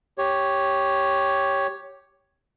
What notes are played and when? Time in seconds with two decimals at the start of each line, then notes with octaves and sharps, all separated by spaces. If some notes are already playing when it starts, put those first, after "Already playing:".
0.18 G4 C#5